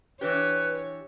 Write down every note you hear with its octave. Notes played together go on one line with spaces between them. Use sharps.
E3 D4 G4 B4 C#5